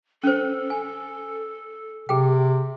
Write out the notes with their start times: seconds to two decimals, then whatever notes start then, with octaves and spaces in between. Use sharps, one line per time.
0.24 C#4 A4 C5
0.70 G#5
2.09 C3 G#4 G5